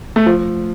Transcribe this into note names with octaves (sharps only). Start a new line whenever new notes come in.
A3
F3